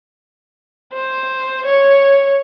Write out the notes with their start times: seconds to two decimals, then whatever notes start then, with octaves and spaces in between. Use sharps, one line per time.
0.93 C5
1.65 C#5